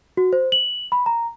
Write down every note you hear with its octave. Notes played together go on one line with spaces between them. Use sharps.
F#4
C5
F#7
B5
A#5